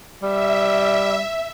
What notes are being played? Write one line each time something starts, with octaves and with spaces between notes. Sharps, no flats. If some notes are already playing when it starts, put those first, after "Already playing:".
G3 E5